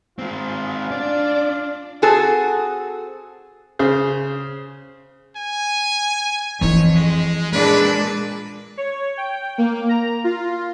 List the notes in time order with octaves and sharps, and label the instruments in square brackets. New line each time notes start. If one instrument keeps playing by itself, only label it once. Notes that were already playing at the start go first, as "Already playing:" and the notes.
[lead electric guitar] G#3 C4 [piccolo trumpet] F4
[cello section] D4 [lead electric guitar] D5
[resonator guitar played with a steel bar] C4 F#4 G#4 A4
[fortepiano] C#3 G#4 C5
[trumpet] G#5
[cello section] F2 [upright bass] E3 E4 [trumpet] C#5
[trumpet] G#3
[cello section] A#2 D4 [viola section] G#3 [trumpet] B4
[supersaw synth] C#5
G5
A#3
A#5
F4